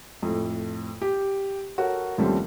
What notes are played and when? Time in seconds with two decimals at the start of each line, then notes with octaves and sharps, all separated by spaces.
0.22 F2 A2
1.02 G4
1.78 F#4 A4 A#4 C#5
2.18 D#2 F3 G3 A3 C4 C#4